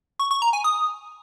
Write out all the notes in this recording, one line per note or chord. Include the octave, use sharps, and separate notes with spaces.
C#6
C#6
A#5
G#5
D#6